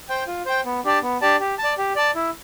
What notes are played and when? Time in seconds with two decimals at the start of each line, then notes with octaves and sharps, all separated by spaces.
0.09 C5 G5
0.27 F4
0.46 C5 G5
0.65 B3
0.84 D4 G4 D5 A5
1.02 B3
1.21 D4 G4 D5 A5
1.40 G4
1.58 A5
1.64 D5
1.78 G4
1.96 D5 A5
2.15 E4